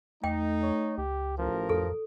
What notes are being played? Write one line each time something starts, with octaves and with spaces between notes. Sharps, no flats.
E2 A3 D#4 G5
C#5
C#2 G4
A1 F3 A#4
F2 A4